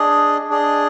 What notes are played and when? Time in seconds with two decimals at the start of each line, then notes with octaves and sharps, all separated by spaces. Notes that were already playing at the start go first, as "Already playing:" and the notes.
Already playing: D4 G#4 D#5
0.50 D4 G#4 D#5